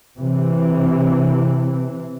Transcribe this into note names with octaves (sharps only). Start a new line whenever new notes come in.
C3 E3